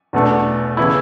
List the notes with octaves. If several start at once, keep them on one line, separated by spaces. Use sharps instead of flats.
E2 B2 A3 D4
C#3 E3 B3 E4